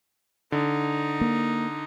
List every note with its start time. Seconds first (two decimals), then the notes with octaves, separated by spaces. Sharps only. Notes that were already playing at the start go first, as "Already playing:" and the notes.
0.52 D3 D#4
1.21 A#3